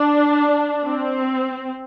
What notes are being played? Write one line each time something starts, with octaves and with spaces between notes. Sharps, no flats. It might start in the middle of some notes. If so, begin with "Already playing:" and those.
Already playing: D4
C4